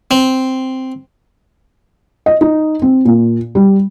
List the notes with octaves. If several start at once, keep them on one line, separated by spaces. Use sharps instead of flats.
C4
D#5
D#4
C4
A#2
G3